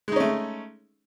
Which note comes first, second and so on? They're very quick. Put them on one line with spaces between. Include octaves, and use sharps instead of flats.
G#3 D#4 C#4 A3